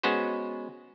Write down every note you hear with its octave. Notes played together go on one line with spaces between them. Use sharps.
G#3 B3 C#4 F#4 B4 C5